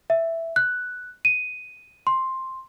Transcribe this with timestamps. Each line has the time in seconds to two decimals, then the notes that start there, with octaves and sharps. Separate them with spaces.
0.10 E5
0.56 F#6
1.25 D#7
2.07 C6